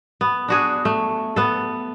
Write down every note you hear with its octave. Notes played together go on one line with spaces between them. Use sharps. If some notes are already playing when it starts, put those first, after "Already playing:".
B3
D4 F#4 G#4
A3
B3 A4